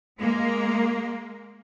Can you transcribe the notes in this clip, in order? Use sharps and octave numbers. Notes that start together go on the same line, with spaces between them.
G#3 A#3